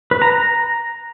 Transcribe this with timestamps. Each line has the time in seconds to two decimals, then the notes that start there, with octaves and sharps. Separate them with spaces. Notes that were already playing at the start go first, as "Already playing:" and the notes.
0.11 B4
0.22 A#5
0.32 A#5